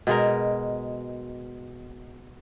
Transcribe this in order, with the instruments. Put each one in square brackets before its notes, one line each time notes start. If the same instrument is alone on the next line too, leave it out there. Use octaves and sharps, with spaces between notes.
[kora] B2 G#3 A#4